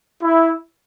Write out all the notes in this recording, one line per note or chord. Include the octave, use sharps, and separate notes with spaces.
E4